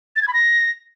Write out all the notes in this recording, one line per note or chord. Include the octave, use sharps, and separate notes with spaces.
A6
G#6
B5
A#6